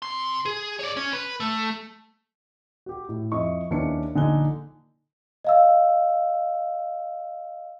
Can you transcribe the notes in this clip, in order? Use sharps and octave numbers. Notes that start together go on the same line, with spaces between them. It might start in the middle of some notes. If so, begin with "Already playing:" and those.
C3 C6
G#4
C#5 D5
C#4
B4
A3
F#4 G4
A2
F2 E4 D#5 C#6
D#2 C#4 D4 E4 B4 C#7
A#1 D3 D#4 G#5 F#6 G7
D#5 F5 E6